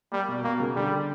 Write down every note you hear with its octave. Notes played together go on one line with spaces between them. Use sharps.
G3 A#3
B2
B2 A#3
C#3
D3 G3